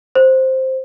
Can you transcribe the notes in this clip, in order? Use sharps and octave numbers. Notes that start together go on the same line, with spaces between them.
C5